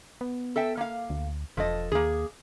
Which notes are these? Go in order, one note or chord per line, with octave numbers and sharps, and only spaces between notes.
B3
A4 E5 G5
A#3 F5
D2
E1 F3 A4 D#5
D#2 A#3 G#4